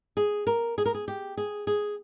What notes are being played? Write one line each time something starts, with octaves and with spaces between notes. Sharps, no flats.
G#4
A#4
G#4
A#4
G#4
G4
G#4
G#4